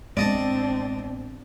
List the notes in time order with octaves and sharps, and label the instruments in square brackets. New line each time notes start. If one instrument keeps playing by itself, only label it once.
[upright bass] A1 B3 [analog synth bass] G#3 [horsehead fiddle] C4 D4 [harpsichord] D5 D#5 A5